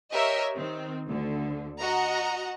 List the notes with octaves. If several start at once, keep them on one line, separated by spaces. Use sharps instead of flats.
G4 A#4 C#5 D#5 E5 E6
D#3 C4
D2 D3
F#4 D#5 F#5 A#5